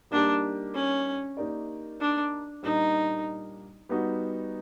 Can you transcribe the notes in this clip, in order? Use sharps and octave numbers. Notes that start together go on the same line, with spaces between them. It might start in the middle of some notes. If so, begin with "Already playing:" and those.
G3 A#3 D4 D#4 G4
C#4
A#3 D#4 G4 A#4 D5
D4
A#2 G3 A#3 D4 D#4
G3 B3 D#4 F#4